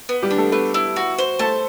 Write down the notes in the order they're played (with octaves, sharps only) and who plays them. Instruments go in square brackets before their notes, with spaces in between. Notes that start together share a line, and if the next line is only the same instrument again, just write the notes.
[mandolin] B3
[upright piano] G3 G4
[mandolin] D4
[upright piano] A3 A4
[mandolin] A3 [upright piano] B3 B4
[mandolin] E4
F#4
C5
[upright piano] A3 A4 [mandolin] A5